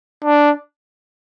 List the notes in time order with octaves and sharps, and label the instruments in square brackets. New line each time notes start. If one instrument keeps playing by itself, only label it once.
[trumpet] D4